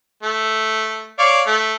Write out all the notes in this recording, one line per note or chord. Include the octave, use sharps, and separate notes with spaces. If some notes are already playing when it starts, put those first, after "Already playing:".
A3
C#5 D5 F5
A3